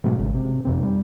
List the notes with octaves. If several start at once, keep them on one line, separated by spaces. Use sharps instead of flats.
G#2 B2 F#3 A3
G#1 C#3
C3
F2 C3 C4
G3